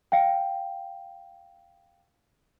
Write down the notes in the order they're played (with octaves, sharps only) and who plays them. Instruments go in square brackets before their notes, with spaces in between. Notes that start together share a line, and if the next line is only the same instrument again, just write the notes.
[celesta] F5 G5